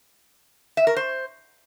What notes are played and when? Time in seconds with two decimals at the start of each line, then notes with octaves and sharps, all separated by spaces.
0.77 E5
0.87 A#4
0.97 C5